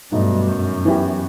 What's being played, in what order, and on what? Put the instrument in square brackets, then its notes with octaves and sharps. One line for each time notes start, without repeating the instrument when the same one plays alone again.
[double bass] G2 [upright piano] B2 F#3 A3 D#4
[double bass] F#2
[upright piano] E3 B3 E4 G4